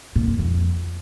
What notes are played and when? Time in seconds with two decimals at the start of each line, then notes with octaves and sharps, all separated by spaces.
0.16 A#2
0.27 F#2
0.39 F2